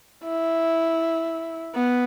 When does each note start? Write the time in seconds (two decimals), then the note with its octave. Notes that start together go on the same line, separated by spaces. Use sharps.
0.24 E4
1.75 B3